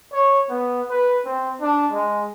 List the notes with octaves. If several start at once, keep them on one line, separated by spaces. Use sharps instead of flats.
C#5
B3
B4
C4
D4
G#3